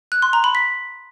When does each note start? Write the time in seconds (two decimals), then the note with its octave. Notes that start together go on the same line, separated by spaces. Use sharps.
0.12 F#6
0.22 C6
0.33 A#5
0.44 B5
0.55 B6